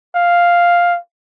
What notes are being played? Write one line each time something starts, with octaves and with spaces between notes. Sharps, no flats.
F5